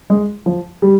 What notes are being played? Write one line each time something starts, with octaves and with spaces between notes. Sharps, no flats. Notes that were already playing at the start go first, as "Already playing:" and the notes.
G#3
F3
G3